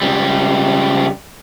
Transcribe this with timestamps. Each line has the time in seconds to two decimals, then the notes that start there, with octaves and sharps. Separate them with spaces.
0.02 C#2 G3